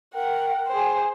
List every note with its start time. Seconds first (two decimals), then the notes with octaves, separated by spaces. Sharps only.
0.14 A#4 F#5 G5
0.68 G#4 C5